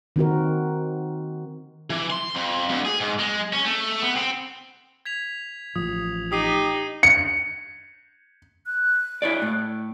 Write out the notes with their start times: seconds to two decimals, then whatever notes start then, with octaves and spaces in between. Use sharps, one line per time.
0.16 D#3 C4 F#4 A#4
1.90 E3
2.10 C6
2.35 F2
2.69 D2
2.85 G#4
3.01 G#2
3.19 G#3
3.53 C#4
3.65 A3
4.02 B3
4.16 C4
5.05 G#6 B6 F7
5.76 A1 F3 D#6
6.32 D#4 G4 D#6 C7 D#7
7.03 C#7
8.66 F#6
9.22 E4 C#5 D5
9.42 A2